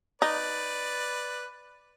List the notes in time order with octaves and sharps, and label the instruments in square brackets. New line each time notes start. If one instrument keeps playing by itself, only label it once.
[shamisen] D#4 [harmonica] B4 D5